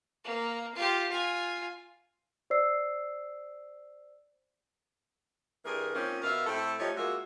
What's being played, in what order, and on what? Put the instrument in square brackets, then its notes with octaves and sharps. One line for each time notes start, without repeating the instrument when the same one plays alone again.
[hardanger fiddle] A#3
F4 G4
F4 G#5
[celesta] C5 D5 E6 C7
[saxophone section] G2 E3 G#4 A#4
F3 A#3 C4 C#4 D#4
B2 A#4 E5 F5
A2 A3 C4 A4
F3 A3 D#4 G4 C#5
G#3 A#3 F4 F#4 E5